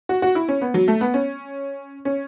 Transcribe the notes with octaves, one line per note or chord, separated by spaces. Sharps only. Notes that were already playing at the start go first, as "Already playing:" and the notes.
F#4
F#4
E4
C#4
B3
F#3
A3
B3
C#4
C#4